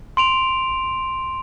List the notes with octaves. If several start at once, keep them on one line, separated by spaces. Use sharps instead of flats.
C6 D7 F7